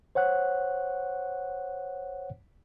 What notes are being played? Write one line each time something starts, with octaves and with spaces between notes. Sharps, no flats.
C5 C#5 F#5 F#6